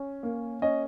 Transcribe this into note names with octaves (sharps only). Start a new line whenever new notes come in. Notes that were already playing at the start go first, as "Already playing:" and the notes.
Already playing: C#4
A#3
C#4 D#5